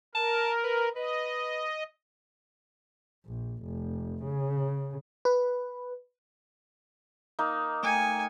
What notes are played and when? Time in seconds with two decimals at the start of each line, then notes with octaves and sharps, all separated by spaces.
0.15 A#4 A5
0.64 B4
0.96 B4 D#5
3.25 A#1
3.63 F1
4.23 C#3
5.25 B4
7.39 A#3 D#4
7.83 A3 G5 G#5 C#7